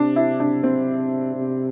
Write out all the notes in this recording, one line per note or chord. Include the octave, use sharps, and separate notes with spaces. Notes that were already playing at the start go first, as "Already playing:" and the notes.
Already playing: C3 D4
E4
D4
C4
C3